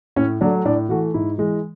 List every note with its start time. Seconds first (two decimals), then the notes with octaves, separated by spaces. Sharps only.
0.16 A2 C#4
0.41 F#3 A3 D4
0.65 A2 D4
0.89 E3 A3 F#4
1.14 G#2 E4
1.38 E3 G#3